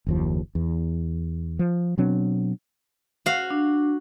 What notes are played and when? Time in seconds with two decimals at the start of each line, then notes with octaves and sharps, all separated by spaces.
0.07 F#1 D#2 F3
0.55 E2
1.59 F3
1.98 B2 F#3 C4 D4
3.26 F#4 F5
3.50 D4